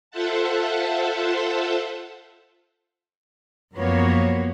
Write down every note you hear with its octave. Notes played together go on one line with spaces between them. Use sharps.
F4 A4 C5 E5 F#5 A5
F#2 F3 A#3 B3 F#4 C#5